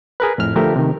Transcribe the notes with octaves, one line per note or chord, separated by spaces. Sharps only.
G#4 A#4 B4
F2 A2 F6
D3 F3 A3 G4 A#4
C3 D#3